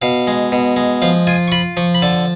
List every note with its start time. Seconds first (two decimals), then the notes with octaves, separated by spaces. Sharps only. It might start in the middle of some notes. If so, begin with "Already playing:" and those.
0.02 B2 F5
0.27 G#3
0.52 B2
0.76 G#3
1.02 F3 F5
1.27 F4 G#5
1.48 C#6
1.52 F4 B5
1.77 F3 C#6
1.94 B5
2.02 D3 A5